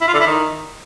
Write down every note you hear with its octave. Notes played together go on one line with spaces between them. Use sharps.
E4
F4
D3
E4
D#3